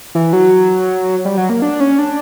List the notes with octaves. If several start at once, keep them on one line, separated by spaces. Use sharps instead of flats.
E3
F#3
G3
F#3
A#3
D4
C#4
D4